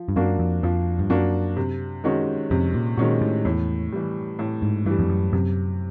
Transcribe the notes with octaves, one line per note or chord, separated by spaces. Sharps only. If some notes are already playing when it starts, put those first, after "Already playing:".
Already playing: F3
G2
F#2 A#3 D4 F#4
F2
F2 F3
G2
F#2 A#3 D4 F#4
C3
D#3 G#3 C#4 F#4
F2 C3
A#2
A#2 D#3 G#3 C#4 F#4
A2
E2 A2
E3 G3
A2
G#2
G2 E3 G3
F2
F#2
F#2 C3